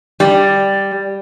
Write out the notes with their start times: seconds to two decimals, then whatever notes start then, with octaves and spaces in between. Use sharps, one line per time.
0.20 G3